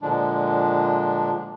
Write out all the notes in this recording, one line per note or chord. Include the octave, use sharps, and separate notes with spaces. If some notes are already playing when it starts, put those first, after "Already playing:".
A#2 D3 F3 G#3 D4